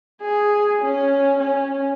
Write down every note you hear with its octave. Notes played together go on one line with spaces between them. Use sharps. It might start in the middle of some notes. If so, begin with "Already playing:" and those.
G#4
C#4
C#4